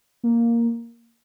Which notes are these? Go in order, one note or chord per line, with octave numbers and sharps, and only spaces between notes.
A#3